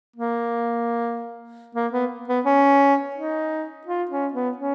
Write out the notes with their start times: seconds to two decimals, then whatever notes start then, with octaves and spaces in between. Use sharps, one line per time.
0.16 A#3
1.75 A#3
1.93 B3
2.28 B3
2.45 C#4
3.16 D#4
3.87 F4
4.10 C#4
4.33 B3
4.57 C#4